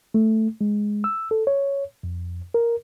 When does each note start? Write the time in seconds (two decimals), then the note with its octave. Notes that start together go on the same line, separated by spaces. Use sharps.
0.14 A3
0.61 G#3
1.04 E6
1.31 A4
1.47 C#5
2.03 F2
2.54 A#4